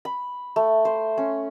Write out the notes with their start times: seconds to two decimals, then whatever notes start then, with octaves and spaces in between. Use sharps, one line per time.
0.05 B5
0.56 A3
0.85 C5
1.18 C#4